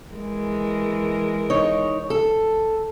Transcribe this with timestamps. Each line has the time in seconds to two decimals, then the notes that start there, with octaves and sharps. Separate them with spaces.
0.14 E3 G#3 A#4
1.50 D#4 C#5
2.10 A4